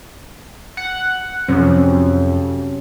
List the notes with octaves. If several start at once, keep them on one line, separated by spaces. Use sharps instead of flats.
F#5
F2 C3 F#3 C#4